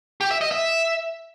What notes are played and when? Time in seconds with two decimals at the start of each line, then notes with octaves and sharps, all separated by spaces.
0.21 G4
0.31 E5
0.41 D#5
0.51 E5